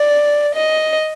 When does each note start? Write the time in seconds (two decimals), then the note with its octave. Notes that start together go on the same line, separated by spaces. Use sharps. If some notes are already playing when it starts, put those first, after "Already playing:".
Already playing: D5
0.55 D#5